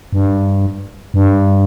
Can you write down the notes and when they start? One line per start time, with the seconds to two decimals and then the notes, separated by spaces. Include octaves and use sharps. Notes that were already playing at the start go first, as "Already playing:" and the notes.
0.13 G2
1.14 G2